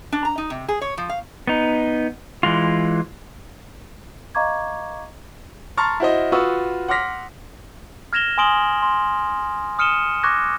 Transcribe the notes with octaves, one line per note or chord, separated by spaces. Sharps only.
D4
A#5
D#4
C3
G#4
C#5
F3
F5
B3 D#4
E3 G#3 F4
D#5 F5 A#5 C#6 D6 G#6
A5 A#5 C6 C#6 F6 A6
E4 F#4 C5 D#5
F4 F#4 B4 C#6 D#6 E6
F#5 C6 D6 F6 A#6 B6
F6 G#6 A#6 E7 F7 G7
G#5 C6 D#6 D7 F#7 G7
C6
D#6 F6 C#7 D#7 E7 G7
C#6 D6 F#6 G#6 A#6